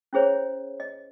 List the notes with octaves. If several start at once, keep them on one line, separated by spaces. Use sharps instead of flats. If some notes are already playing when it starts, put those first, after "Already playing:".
C#4 E4 G#4 C5 C#5
D#5